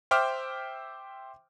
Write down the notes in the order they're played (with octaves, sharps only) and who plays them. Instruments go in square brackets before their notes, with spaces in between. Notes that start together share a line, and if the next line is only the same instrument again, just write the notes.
[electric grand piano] C5 E5 G5 D6 F6